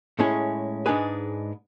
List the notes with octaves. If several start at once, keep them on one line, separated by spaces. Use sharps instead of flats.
A2 G#3 C#4 E4 G#4
G#2 G#3 D4 G#4 B4